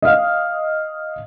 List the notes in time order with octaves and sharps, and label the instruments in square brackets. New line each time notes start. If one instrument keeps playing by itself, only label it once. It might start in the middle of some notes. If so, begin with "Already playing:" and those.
[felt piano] D#5 F5